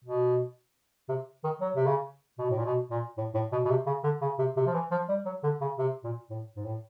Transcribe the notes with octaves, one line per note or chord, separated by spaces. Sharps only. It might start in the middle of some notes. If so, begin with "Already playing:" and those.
B2
C3
D#3
F#3
C3
C#3
B2
A2
A#2
B2
A#2
A2
A2
B2
B2
C3
C#3
D3
C#3
C3
C3
F3
E3
F3
G3
F#3
D3
C#3
C3
A#2
A2
G#2
A2